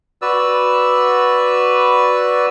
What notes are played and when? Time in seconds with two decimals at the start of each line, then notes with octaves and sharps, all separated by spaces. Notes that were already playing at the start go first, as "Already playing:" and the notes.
0.22 F#4 B4 D5 E6